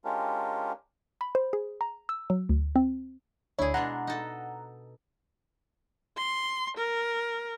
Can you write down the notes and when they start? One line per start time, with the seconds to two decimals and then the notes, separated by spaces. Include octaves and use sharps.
0.05 G#3 C#4 D4 F4 G4 A#4
1.21 B5
1.35 C5
1.53 G#4
1.81 A#5
2.09 E6
2.30 F#3
2.49 D2
2.76 C4
3.59 D2 D4 E4 G#4 C#5
3.74 B2 G#3 D4 F#5 A#5
4.07 D#4 A4
6.17 C6
6.77 A#4